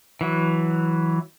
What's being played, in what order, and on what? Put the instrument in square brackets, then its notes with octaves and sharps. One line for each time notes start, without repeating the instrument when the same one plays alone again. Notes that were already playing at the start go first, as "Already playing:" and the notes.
[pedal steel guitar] E3 F#3